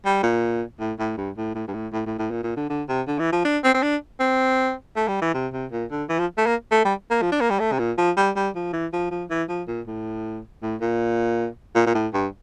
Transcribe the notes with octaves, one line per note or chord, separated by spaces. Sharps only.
G3
A#2
A2
A2
G2
A2
A2
G2
A2
A2
A2
A2
A#2
A#2
D3
D3
C3
D3
E3
F3
D4
C4
C4
D4
C4
A3
G3
E3
C3
C3
A#2
D3
E3
F3
A3
A#3
A3
G3
A#3
F3
D4
A#3
G3
A3
C3
A#2
F3
G3
G3
F3
E3
F3
F3
E3
F3
A#2
A2
A2
A#2
A#2
A#2
A2
G2